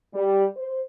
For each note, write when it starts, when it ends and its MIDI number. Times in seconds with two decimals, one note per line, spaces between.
0.14 0.45 55
0.56 0.79 72